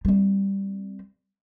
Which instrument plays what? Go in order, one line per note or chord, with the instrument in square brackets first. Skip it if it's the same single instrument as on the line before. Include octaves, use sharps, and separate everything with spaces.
[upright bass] G3 C4